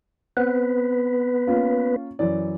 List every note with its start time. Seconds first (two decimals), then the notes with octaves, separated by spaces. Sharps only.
0.37 B3 C4 B4
1.47 A#3 C#4 F4
2.19 F#2 E3 D5